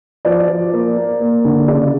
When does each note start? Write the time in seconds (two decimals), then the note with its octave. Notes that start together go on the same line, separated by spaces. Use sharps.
0.25 F3 D5
0.48 F3
0.72 A#3
0.96 A#3
1.20 A#3
1.44 D3
1.68 C#3 D5